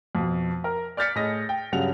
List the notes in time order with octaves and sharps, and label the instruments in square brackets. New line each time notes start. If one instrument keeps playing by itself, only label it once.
[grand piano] F2 B2
A#4
D5 F6 G6 A6 B6 C#7
A2 G#4 D#5 D#6 A#6
G5
G2 C#3 F#3 F#5 F7